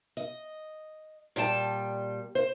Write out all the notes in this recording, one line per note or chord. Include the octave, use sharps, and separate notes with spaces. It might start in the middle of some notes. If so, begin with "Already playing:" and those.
D#5
A#2 G3 G5 A5
C5